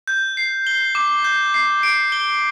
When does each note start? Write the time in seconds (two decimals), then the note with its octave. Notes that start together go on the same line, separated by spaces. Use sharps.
0.07 G6
0.37 C7
0.67 G7
0.95 D6
1.24 G6
1.54 C7
1.83 D7
2.12 G7